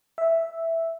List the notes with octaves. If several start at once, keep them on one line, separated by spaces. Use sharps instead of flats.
E5